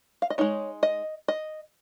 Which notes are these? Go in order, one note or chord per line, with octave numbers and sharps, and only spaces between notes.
F5
D#5
G#3 D#4 C#5
D#5
D#5